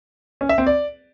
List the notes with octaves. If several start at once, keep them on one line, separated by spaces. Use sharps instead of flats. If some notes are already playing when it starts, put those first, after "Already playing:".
C#4
E5
C4
D5